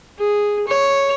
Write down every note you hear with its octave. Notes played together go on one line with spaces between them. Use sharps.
G#4
C#5